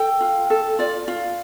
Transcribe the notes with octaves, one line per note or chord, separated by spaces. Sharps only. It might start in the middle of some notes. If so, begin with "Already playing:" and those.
Already playing: A4 G5
F4
A4
F4 D5
F4